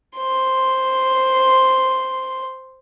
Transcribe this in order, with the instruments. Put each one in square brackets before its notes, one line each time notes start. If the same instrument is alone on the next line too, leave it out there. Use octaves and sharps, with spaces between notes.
[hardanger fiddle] C5 C6